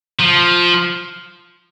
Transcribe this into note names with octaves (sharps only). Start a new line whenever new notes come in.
F3